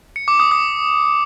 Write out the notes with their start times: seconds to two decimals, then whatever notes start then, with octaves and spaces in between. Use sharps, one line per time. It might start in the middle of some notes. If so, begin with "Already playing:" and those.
0.16 C#7
0.28 D6
0.40 D#6
0.51 D#6